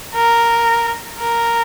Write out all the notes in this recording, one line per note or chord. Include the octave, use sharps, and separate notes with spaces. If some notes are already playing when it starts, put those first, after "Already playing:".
A#4
A#4